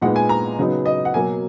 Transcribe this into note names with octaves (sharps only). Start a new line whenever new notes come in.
A#2 G#3 B3 D#4 F#5
G#5
A#5
C#3 F#3 B3 D#4
D#5
F#5
B2 F#3 A#3 G#5